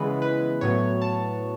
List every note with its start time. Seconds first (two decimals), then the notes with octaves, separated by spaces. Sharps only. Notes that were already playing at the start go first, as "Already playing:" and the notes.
Already playing: C#3 E3 G#3 B3 B4
0.22 B4
0.61 A2 F#3 B3 C#5
1.02 A5